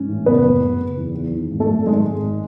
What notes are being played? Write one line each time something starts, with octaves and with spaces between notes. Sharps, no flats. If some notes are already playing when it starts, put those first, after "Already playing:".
Already playing: G#2 C#4
A1
F#1 B3 B4
F#1
F#1
F#1
E2
E2
D#3
G#1
A3 A4
F#2
G#1 G#3 G#4
G#1
G#1